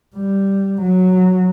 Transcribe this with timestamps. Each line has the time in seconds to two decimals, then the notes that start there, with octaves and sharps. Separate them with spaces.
0.16 G3
0.82 F#3